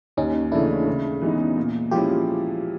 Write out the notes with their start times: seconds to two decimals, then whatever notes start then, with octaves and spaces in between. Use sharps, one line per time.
0.17 D#2 C#4 D#4
0.52 C#3 E3 A3 D4 E4
0.87 C#3
1.22 E3 G#3 B3 D#4
1.57 A#2
1.91 F3 G#3 C#4 E4 F4 G4